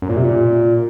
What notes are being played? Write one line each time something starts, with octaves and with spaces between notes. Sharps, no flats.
F#2
A#2
C3
A#2